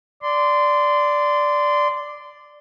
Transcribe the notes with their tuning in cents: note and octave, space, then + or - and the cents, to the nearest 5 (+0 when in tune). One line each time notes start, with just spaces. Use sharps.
D5 +0 C6 -20